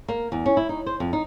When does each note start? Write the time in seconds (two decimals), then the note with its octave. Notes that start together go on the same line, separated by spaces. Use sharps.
0.08 A#3
0.32 E2
0.46 C#4
0.57 E4
0.69 D#4
0.86 C5
1.00 F2
1.13 D#4